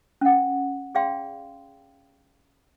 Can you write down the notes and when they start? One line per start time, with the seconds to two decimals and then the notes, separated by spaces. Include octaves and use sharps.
0.21 C#4 F#5
0.95 G#4 D5 F5 G5 C6